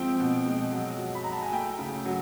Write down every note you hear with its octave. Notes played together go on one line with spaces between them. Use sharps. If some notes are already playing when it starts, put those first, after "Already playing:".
Already playing: F3 G#3 C4 G5
B2
G#3
F#3
F#3
B5
F#3 A#5
A5
G#5
A3 G5
C#3
F#3